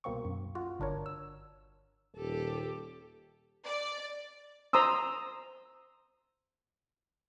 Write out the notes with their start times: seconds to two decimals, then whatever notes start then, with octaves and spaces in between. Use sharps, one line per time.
0.04 C2 B2 A#3 C4 C#6
0.25 F#2
0.55 F4 F#4
0.80 G1 D4 A#4 C#5
1.06 E6
2.16 D#1 G4 A4
3.66 D5
4.73 C5 A#5 C6 D#6 E6